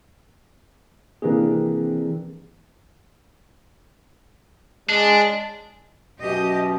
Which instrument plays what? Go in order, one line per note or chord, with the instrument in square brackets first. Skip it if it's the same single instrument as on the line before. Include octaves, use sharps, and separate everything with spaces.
[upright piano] C3 A#3 D4 [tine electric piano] E3 G#4
[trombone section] G#3 [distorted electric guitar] D4
[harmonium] F#2 B2 [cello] G4 D#5